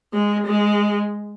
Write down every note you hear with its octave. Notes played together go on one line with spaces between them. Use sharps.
G#3
G#3